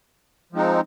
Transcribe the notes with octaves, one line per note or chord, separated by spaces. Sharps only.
F3 G#3 C4 D#4